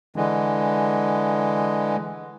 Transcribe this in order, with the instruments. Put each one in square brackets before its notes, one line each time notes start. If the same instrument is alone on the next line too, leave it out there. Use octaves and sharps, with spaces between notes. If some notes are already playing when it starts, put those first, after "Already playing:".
[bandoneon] D3 E3 G#3